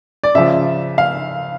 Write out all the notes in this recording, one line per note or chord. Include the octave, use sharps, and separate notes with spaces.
D5
C#3 F3 E5
F5